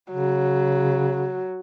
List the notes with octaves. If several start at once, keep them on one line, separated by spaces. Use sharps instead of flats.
C#3 F#3